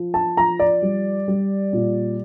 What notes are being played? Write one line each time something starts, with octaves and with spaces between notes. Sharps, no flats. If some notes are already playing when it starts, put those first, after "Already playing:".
Already playing: F3
A5
F3 A#5
D5
G3
G3
A#2